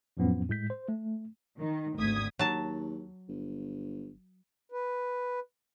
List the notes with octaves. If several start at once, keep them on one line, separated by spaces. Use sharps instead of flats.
F2 A2 F3 F#3 B3 C#4
A2 G#3 G6 B6
C5
A3
D#3
G#1 D2 D#6 G#6 B6
D#2 F#3 A5
G1
B4